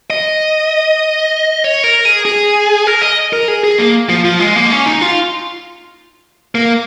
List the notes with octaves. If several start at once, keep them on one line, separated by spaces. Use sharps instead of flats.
D#5
C#5
A#4
G#4
G#4
A#4
D#5
A#4
G#4
G#4
A#3
F3
F3
G#3
A#3
C#4
D#4
F4
A#3